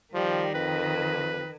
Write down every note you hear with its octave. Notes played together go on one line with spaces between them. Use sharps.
D#3 F3 G3
F2 B4